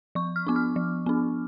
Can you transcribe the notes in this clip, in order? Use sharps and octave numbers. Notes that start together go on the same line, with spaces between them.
F3 C#6
F6
B3 D4 D6
F6
F3
B3 D4